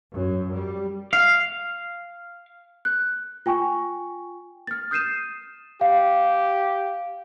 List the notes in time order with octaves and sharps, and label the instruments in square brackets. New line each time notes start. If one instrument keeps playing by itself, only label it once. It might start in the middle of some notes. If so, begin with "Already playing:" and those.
[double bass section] F#2
G3
[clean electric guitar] F5
[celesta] F#6
F4 G5 G#5 C#6
F6 A6
D#6 G6 C7 D#7 E7
[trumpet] G4 [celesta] F5